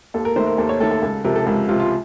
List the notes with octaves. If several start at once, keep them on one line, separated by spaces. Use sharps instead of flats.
D#2 A4
A#4
D#3 A3 C5
A#4
D#2 A4
C#5
D#3 A3 A4
A4
C#2 A4
C3 F3 A#4
A4
C#2 A4
C3 F3 F4
F4